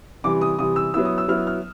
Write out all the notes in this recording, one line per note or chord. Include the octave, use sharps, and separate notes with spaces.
C3 E3 G3 D6
D#6
C3 E3 G3 D#6
E6
F#3 B3 E4 E6
D#6
E6
F#3 B3 E4 F6
F6